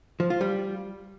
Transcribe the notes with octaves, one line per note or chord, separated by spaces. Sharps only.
F3
F4
G3